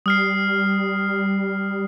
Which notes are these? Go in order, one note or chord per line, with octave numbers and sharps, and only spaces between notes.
G3 D#6 F6 C7